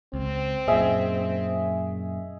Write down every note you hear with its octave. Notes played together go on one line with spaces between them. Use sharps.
C#2 C4
F#2 A#2 G#4 D#5 E5